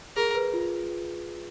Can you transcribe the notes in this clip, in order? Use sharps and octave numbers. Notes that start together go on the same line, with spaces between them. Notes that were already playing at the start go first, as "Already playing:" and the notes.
G#4 A#4
B4
F4